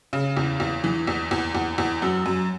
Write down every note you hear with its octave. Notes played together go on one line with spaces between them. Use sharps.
C#3
E2
E2
E3
E2
E2
E2
E2
F#2
F#2